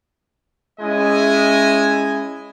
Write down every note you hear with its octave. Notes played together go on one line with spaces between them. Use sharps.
G#3 C#4 E4 D#5 E5 G#5